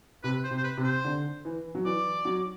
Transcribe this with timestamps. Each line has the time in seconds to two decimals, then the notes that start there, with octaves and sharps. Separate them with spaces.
0.24 C3 B4
0.44 C5
0.51 C3
0.57 C5
0.64 B4
0.77 C3
0.84 C5
1.04 D3
1.45 E3
1.75 F#3
1.85 E3 D5
2.25 F#3